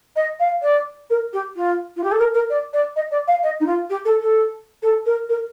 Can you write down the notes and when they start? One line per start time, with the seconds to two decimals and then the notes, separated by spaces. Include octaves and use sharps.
0.16 D#5
0.40 F5
0.62 D5
1.10 A#4
1.33 G4
1.56 F4
1.97 F4
2.04 G4
2.12 A4
2.19 A#4
2.34 A#4
2.50 D5
2.73 D5
2.96 D#5
3.11 D5
3.28 F5
3.43 D#5
3.60 D#4
3.66 F4
3.90 G4
4.05 A4
4.21 A4
4.83 A4
5.06 A#4
5.29 A#4